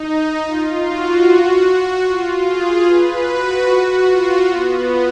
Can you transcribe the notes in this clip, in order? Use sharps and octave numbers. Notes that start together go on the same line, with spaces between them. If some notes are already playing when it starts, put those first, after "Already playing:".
Already playing: D#4
F4
F#4
F4
G#4
B4
F#4
F4
B3